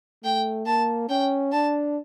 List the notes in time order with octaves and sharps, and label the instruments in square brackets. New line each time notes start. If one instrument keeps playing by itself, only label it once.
[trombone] A3 [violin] G5
[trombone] A#3 [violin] A5
[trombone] C#4 [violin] G5
[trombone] D4 [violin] A5